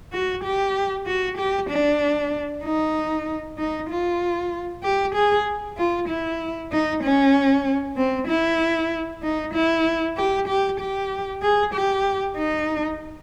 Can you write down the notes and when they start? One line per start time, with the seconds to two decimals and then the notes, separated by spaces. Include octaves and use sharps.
0.13 F#4
0.44 G4
1.07 F#4
1.37 G4
1.70 D4
2.64 D#4
3.58 D#4
3.90 F4
4.83 G4
5.15 G#4
5.77 F4
6.09 E4
6.72 D#4
7.03 C#4
7.97 C4
8.28 E4
9.23 D#4
9.54 E4
10.17 G4
10.48 G4
10.80 G4
11.42 G#4
11.74 G4
12.37 D#4